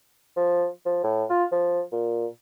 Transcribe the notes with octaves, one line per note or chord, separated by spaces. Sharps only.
F3
F3
A2
F4
F3
A#2